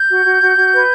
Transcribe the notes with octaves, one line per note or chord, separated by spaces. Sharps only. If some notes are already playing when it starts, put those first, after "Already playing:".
Already playing: G6
F#4
F#4
F#4
F#4
B4